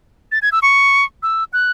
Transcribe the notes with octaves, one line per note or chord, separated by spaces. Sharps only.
A6
G#6
E6
C#6
E6
F#6